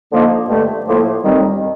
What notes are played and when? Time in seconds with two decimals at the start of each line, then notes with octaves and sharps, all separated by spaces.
0.10 D3 F3 A#3 D#4
0.49 G2 D3 A3
0.86 A2 F3 A#3
1.24 D#2 D#3 G3 C4